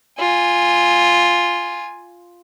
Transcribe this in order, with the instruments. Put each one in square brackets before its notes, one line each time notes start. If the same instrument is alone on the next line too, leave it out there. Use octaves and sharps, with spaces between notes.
[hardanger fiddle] F4 G#5